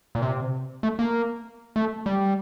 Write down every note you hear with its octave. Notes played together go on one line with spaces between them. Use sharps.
A#2
C3
A3
A#3
A3
G3